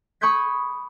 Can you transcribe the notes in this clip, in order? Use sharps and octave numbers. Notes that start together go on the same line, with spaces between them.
B5 C#6 D#6 G6 G#6 B6